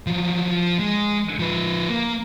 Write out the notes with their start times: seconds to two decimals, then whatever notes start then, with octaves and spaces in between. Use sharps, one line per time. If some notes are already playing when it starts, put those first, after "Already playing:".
0.07 F3 F#3
0.48 F3
0.79 G#3
1.39 F3 B4
1.89 A#3